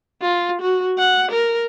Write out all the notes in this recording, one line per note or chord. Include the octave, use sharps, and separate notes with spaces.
F4
F#4
F#5
A#4